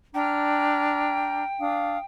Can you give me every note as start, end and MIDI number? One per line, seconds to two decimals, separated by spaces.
0.14 1.44 62
0.14 2.05 79
0.14 1.44 82
0.14 1.44 89
1.59 1.97 62
1.59 1.97 77
1.59 1.97 87